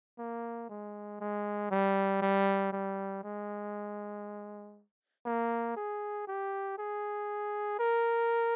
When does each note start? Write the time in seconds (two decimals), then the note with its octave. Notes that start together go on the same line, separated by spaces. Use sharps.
0.19 A#3
0.69 G#3
1.21 G#3
1.71 G3
2.22 G3
2.73 G3
3.24 G#3
5.26 A#3
5.77 G#4
6.28 G4
6.79 G#4
7.79 A#4